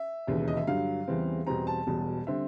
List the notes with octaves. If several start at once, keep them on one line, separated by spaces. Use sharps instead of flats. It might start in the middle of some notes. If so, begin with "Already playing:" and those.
Already playing: E5
E1 D#2 C#3 E3
D#5
E5
G2 D3 F#3 F5
E2 C#3 E3 G3 C4
E2 B2 G3 C4 A#5
A5
E1 E2 B2 G3
D3 G3 C4 E5